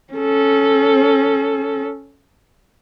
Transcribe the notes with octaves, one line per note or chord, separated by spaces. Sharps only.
C#4 A4